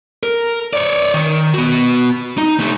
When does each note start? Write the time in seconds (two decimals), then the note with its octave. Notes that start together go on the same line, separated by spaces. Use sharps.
0.23 A#4
0.73 C#5 D5
1.14 D#3
1.54 B3 F#4
2.38 D#4
2.60 A3 D#4